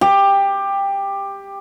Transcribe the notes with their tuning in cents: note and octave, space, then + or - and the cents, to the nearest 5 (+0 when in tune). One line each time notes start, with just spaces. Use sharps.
G4 +15